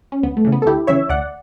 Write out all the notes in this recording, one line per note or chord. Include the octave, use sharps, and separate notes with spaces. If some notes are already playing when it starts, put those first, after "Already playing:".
C#4
D2 B3
A3
C#3 E3
B3
A4
D2 E4 G4
C#3 E3 C#5 E5
D2 D5 F#5